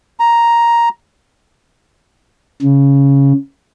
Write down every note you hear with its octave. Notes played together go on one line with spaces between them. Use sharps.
A#5
C#3